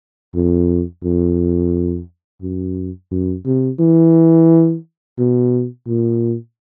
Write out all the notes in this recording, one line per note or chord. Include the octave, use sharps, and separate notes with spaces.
F2
F2
F#2
F#2
C3
E3
B2
A#2